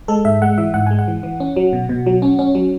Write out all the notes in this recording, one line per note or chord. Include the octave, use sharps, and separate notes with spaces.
G#3 A4
G#2 E5
G#3 F#5
E3 E5
G#2 F#5
G#3 G#5
F#5
E3
E3
C#4
F#3
B2
B2
F#3
C#4
C#4
F#3